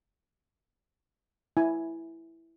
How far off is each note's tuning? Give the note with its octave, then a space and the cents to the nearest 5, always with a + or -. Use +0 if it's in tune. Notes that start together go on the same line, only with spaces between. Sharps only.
E4 +0 G#5 +0